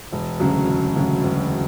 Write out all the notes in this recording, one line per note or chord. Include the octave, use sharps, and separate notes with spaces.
E1
D2 C#3 F#3
E1
D2 C#3 F#3
E1